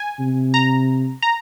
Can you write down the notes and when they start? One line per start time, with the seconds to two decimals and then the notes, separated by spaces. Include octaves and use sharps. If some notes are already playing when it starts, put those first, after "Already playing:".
Already playing: G#5
0.20 C3
0.54 A#5
1.22 A#5